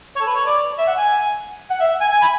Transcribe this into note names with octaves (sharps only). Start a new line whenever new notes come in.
C#5
A4
B4
C#5
D5
E5
F#5
G#5
F#5
E5
G#5
G#5
B5